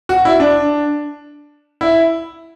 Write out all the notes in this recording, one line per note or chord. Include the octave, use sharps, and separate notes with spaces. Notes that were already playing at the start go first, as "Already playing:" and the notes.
F#4
E4
D4
E4